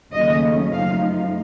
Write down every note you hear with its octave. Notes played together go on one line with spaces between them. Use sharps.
D#2 C#3 F#3 A3 C#4 D#5
F#2 F3 A3 D#4 F5